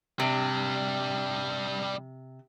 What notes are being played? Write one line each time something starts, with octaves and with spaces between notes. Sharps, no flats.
C3 G3 D4